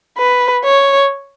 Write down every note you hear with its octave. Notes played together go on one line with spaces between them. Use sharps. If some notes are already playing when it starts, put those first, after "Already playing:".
B4
C#5